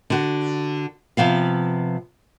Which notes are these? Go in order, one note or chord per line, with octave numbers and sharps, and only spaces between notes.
D3 F#4
C3 F3 B3 F5